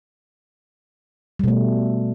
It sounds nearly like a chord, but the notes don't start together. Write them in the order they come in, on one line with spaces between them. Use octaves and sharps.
G3 B2 A3